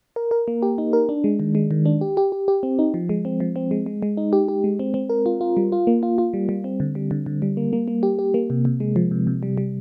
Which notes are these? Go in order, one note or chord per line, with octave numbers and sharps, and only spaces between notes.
A#4
A#4
A#3
G4
D#4
A#4
D4
G#3
D#3
G#3
D#3
D4
G4
G4
G4
G4
C4
D#4
F3
G#3
C4
F3
C4
G#3
G#3
G#3
D#4
G4
G4
G#3
C4
C4
A#4
F4
F4
G3
F4
A#3
F4
F4
G3
G3
C4
D3
G3
D3
D3
G3
A#3
A#3
A#3
G4
G4
A#3
C3
C3
G#3
F3
C3
C3
G3
G3